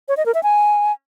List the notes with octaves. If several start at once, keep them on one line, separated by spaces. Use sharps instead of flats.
C#5
D#5
A#4
E5
G#5